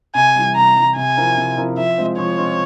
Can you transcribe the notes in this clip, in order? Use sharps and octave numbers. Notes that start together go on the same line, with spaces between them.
C3 G#5
E3 G3
C3 A#5
E3 G3
C3 G#5
F3 C4 E4 A#4
C3
F3 C4 E4 A#4
F3 E5
G#3 C4 F4
F3 C#5
G#3 C4 F4